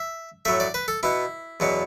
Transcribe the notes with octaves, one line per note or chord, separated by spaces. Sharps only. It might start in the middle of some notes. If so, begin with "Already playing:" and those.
Already playing: E5
A2 F#3 A3 E5
D5
B4
A4
B2 B3 E4
E2 B2 F#3 B3